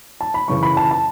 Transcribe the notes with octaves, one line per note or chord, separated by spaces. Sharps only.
A5
B5
F#2 C#3 E3 C#6
B5
A5
A5